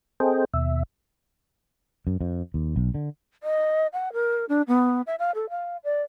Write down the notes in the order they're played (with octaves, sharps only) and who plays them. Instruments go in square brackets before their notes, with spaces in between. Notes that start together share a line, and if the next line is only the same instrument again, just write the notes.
[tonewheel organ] C4 G#4 A4 C5 D#5 G5
D#2 B2 E5
[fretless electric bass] F#2
F2
D#2
B1
D3
[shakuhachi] D#5
F#5
A#4
D4
B3
E5
F5
A4
F5
D5